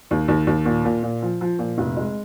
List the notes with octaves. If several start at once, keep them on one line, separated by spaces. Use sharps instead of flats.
D#2
D#2
D#2
A#2
A#2
A#2
F3
F3
A#2
F1
G#3